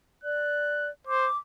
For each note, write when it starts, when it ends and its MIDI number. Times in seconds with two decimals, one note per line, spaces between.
0.24 0.90 74
0.24 0.89 90
1.07 1.28 72
1.07 1.37 86